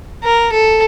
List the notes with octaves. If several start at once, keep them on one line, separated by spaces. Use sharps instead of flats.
A#4
A4